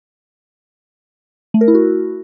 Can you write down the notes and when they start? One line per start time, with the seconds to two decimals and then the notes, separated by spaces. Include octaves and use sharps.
1.54 A3
1.61 A#4
1.68 E4
1.75 F#4